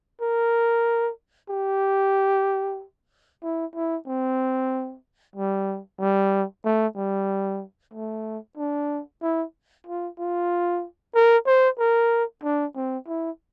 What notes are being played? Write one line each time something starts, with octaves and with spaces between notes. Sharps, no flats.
A#4
G4
E4
E4
C4
G3
G3
A3
G3
A3
D4
E4
F4
F4
A#4
C5
A#4
D4
C4
E4